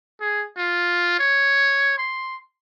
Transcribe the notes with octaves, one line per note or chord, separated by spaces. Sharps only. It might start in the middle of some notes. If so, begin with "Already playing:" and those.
G#4
F4
C#5
C6